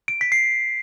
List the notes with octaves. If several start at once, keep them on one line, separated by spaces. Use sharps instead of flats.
D7
B6
C7